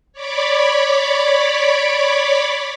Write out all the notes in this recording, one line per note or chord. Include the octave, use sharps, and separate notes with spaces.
C#5 D5 B5 D6